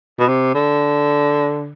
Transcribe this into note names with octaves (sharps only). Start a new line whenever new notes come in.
B2
C3
D3